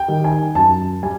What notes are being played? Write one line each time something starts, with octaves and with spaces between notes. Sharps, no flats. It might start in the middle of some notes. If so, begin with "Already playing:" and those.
Already playing: G5
D#3 G3
G#5
F#2 A5
G3 G#5